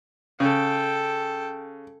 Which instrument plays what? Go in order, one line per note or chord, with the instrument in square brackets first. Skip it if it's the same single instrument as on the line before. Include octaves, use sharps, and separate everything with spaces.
[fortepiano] C#3 [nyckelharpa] A4 G5